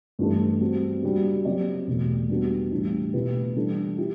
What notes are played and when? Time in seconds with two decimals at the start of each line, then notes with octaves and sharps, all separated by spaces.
0.19 G2 E3 A3
0.61 G3 C4 F#4
1.02 G3 D4 F#4
1.45 F#3 C4 G4 D5
1.87 E2 B2 A3
2.29 G3 B3 D4 F#4
2.71 A2 E3 G3 D4
3.14 B2 A3 E4 G4 B4
3.56 E3 G3 D4 A4
3.98 E4 G4